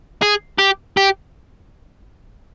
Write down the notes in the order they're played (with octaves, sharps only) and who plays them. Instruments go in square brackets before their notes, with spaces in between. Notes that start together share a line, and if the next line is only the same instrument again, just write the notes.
[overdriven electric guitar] G#4
G4
G4